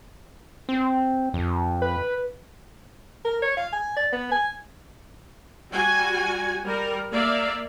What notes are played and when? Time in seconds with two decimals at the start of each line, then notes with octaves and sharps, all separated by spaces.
0.69 C4
1.34 F2
1.82 B4
3.25 A#4
3.42 C#5
3.57 F5
3.73 G#5
3.97 D5
4.12 B3
4.32 G#5
5.72 G3 F#4 G#5
6.64 G3 A#4
7.12 A#3 D5 E5 F5